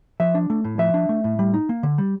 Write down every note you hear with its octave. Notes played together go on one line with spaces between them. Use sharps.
F3 E5
D4
A3
A2
F3 E5
D4
A3
A2
G3
D#4
A#3
D3
G3